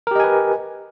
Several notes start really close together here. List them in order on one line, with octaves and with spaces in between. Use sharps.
A#4 G4 D#5 G#5 B4